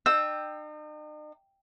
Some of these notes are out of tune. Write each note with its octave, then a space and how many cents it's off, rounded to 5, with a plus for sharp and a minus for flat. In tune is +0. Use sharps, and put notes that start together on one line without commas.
D#4 -45 G5 +0 E6 +0